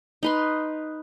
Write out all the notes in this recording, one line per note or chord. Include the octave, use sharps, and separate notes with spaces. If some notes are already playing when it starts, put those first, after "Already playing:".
D#4 B4 C6